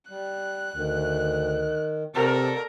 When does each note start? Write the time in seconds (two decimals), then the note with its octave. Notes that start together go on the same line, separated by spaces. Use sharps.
0.10 G3 F#6
0.76 D2 D#3
2.15 C3 A4 A#4 D5